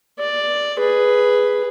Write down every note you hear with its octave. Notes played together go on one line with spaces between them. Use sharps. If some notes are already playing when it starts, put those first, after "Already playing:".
D5
G#4 B4